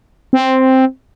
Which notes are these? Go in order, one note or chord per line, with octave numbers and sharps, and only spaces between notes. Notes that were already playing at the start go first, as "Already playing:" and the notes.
C4